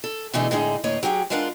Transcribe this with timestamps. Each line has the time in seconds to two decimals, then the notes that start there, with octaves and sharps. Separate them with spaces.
0.04 A4
0.33 B2 D3 E3 A3 D#4 G#4
0.51 A2 D3 G#3 D#4 G#4
0.84 D2 A2 A#3 C#5 D#5
1.03 F#3 G4 G#4 F#5
1.30 E2 G#3 D4 F4 A#4 F#5